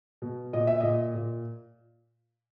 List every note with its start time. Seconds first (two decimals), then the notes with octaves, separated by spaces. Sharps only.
0.22 B2
0.53 A#2 D#5
0.67 E5
0.80 A#2 D#5
1.15 A#2